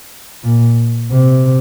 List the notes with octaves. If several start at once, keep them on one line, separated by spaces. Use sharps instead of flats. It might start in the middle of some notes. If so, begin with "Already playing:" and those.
A#2
C3